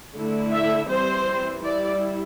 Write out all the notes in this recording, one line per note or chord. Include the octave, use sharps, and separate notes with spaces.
D3 A3 E4
E5
E3 G3 C4 C5
G3 E4 D5